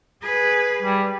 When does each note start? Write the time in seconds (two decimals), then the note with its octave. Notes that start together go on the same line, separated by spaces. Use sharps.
0.22 G#4 B4
0.83 G3